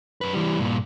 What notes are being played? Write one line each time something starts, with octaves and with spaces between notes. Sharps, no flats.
F#2 B4
E3 G3
G2 A#2